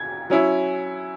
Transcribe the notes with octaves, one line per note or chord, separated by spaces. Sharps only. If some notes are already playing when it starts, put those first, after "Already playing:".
Already playing: G#6
F#3 C#4 E4